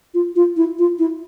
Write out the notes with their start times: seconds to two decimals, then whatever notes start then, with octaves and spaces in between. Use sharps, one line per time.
0.14 F4
0.36 F4
0.57 E4
0.79 F4
0.99 E4